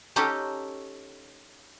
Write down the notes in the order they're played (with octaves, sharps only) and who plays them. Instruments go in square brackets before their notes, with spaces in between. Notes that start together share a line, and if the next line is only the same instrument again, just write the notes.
[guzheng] C#4 D#4 G4 A4